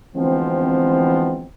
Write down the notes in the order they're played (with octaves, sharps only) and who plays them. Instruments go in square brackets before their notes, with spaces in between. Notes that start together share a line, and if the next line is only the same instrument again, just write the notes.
[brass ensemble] D2 E3 F3 G#3 B3 C4